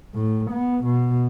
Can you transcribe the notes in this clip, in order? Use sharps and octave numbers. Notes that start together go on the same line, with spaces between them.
A2
B3
B2